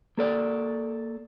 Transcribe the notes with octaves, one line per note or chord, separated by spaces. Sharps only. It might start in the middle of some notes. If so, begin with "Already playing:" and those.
A#3 A4 D5